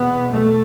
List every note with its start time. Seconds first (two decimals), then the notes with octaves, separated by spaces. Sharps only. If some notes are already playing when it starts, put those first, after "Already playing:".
Already playing: E2 B2 B3
0.34 A3